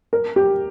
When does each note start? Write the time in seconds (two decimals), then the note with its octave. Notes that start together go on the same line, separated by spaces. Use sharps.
0.13 A#4
0.36 G4